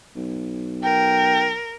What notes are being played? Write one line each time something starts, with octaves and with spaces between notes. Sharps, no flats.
B1
A#4 G5